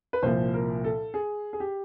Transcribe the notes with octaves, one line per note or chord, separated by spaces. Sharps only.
B4
C2 A#2 F3 C5
A#4
A4
G#4
G#4
G4